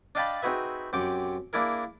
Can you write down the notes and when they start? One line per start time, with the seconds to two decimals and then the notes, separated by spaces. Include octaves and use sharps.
0.15 D4 D#5 F5 G5 A5 B5
0.42 C4 D#4 F#4 G#4 B4 E5
0.93 F#2 C3 G5 D6
1.53 A#3 D4 E4 G#4 A#4